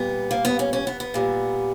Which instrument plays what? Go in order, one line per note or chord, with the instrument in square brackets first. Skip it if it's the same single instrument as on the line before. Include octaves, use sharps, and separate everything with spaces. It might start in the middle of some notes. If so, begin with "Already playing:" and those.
Already playing: [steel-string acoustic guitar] A#2 G3 B3
A#3
B3
C#4
C#4
B3
B3
A#2 G3